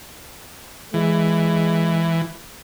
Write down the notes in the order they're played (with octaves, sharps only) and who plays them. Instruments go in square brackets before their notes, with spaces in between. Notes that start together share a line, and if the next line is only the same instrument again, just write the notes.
[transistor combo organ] E3 [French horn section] G#3